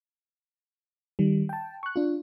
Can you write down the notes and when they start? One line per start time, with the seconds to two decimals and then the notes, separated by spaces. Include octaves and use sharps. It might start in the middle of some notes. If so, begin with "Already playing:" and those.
1.19 D#3 G3
1.49 G5 A5
1.83 C#6 F#6
1.96 D4 F4